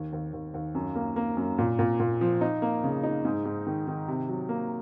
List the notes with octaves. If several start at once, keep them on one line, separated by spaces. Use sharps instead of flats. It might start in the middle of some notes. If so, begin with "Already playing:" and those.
Already playing: D#2
D#2
D#2
D#2
F#2
A#3
A#3
F#2
A#2
A#2
A#2
F3
D#4
A#3
C#3
D#4
G#2
G#2
D#3
D#3
C3
F#3
A#3